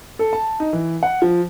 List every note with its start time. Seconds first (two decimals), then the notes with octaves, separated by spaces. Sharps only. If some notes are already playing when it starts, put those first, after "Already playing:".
0.19 A4
0.33 A5
0.60 D#4
0.73 E3
1.03 F#5
1.22 F3